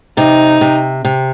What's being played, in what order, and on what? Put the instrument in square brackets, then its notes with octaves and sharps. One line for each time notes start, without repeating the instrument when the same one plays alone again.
[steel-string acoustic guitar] C3 [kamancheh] D#4
[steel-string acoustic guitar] C3
C3